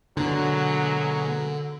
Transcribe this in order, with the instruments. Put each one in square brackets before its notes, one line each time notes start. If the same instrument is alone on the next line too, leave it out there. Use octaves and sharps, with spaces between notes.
[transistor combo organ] B2 G#3 A#3 [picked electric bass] D3 [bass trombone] F#3